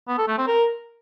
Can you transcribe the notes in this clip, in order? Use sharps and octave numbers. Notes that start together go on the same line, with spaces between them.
B3
A4
A3
C4
A#4